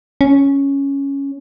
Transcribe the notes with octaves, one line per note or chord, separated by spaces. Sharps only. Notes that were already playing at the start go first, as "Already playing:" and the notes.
C#4